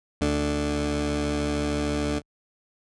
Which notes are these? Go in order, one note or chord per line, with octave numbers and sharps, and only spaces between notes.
D2 D3